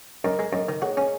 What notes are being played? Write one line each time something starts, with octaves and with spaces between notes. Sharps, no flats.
F#2 A#4 D#5
G#3
F#2 A#4 D#5
D#3
F#4 G#4 C#5
C#4